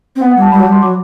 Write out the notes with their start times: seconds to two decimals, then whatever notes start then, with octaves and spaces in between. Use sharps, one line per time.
0.16 C4
0.21 B3 F#5
0.31 F#5
0.37 G3 A5
0.51 G3 B5
0.60 F#3
0.67 G3
0.72 C6
0.82 F#3 D6